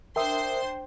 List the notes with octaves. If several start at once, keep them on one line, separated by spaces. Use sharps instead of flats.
D4 A#4 C5 E5 G5 C6 D#6